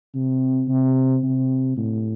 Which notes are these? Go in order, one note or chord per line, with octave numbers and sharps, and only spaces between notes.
C3
C3
C3
A2